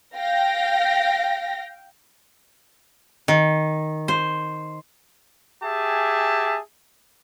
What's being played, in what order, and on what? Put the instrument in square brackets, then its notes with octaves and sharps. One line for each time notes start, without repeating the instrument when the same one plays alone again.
[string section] F5 G5 A#6
[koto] D#3
C5
[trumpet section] G4 G#4 E5 G#5 A5